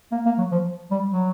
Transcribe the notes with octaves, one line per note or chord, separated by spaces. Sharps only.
A#3
A#3
F#3
F3
G3
F#3